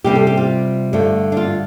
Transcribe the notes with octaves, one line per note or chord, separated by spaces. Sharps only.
C3 G3 C4 G4
A4
G4
F4
G2 D3 A3
D4
F4